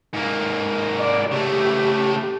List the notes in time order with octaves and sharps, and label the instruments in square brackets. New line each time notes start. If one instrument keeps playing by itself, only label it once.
[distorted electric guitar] G#2 A#3
[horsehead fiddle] D5
[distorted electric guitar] C#3 A3 [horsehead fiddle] G4